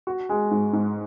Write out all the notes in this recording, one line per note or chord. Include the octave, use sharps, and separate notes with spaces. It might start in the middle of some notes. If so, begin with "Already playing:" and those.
F#4
G#3
G#2
G#2